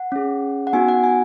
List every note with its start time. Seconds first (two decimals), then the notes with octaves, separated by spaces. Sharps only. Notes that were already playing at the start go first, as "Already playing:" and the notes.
Already playing: F#5
0.12 C#4 G#4
0.67 F#5
0.73 B3 D#4 F#4 G#5
0.89 F#5
1.04 G#5